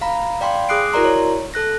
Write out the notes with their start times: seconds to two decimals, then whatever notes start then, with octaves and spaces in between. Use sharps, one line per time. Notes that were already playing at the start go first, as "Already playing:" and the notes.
0.01 F5 A#5 B5
0.41 D5 F5 G5 B5 C6
0.69 G#4 D6 D#6 F#6 C7 D7
0.93 E4 F#4 A#4 D5 A#5 C6
1.05 C#5
1.54 A4 F#6 A#6